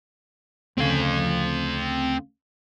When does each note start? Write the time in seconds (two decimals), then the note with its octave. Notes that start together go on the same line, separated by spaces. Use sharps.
0.78 D2 C#3 C4 F5